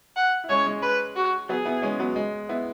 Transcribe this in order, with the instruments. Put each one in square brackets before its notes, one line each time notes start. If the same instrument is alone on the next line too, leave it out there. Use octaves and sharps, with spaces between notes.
[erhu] F#5
[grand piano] E4
[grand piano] G#3 C#4 [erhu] C#5
[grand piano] G#3 C#4
[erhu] B4
F#4
[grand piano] F#3 B3 [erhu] G#4
[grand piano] B3 E4
G#3 C#4
F#3 B3
G#3
B3 E4